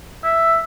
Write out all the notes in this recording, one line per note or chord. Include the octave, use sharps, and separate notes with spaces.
E5